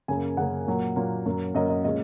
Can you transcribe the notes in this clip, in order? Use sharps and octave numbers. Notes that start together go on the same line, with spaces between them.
F#2 C#3 A#3 G#5
F#2 C#3 A#3 F#5
A#2 F#3 A#3
A#2 F#3 A#3
F#2 F#3 A#3
F#2 F#3 A#3 D#5
D#5
A#2 G#3 C#4 D#5